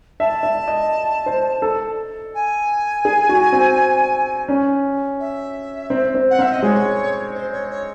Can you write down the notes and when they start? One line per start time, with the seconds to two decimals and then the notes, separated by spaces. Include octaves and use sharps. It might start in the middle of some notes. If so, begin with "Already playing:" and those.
0.19 E5 A5
0.43 E5
0.68 D#5
1.26 C5
1.62 A4
2.34 G#5
3.05 G#4
3.29 F#4
3.52 C4
4.49 C#4
5.19 E5
5.90 C4
6.15 C4
6.30 F#5
6.39 C4 E5
6.51 D#5
6.62 G#3 C#5
7.34 C5
7.51 C#5
7.69 C#5